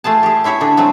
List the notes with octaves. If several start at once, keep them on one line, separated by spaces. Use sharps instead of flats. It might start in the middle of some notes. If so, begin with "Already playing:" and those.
A3 F4 G#4 A5
G4 G#4
C#4 E4 G4 C#5 E5
D3 D4 G#4
F#3 G#3 A3 C4